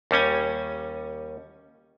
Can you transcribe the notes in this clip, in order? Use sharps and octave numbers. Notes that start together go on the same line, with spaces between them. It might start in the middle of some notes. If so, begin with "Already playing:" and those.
D#2 G3 C#4 G#5